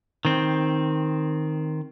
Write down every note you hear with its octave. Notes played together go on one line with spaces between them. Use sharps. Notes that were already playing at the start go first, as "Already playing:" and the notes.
D#3 C4